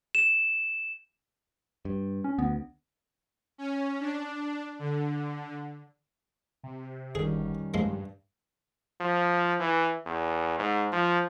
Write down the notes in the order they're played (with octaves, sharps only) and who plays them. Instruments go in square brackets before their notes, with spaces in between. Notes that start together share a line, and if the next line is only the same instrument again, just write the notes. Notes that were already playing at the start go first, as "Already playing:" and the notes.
[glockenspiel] E7
[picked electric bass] G2
[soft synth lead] C#4
[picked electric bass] D2 [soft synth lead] B3
[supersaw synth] C#4
D4
D3
[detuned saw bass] C3
[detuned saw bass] G1 [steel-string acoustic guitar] D#3 G3 C#4 [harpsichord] G#4
[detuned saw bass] G2 [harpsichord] F3 G#3 A#3
[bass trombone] F3
E3
E2
G#2
F3